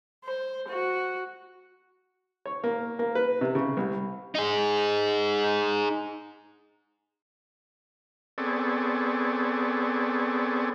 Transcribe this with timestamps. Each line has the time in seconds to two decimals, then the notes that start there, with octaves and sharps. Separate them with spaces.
0.25 C5
0.68 F#4
2.46 C#5
2.64 A#3
2.99 A#3
3.15 B4
3.41 C3
3.55 C#3
3.77 C2
4.35 D#4 G#4
8.38 B3 C4 G#4 A4 C#5 D5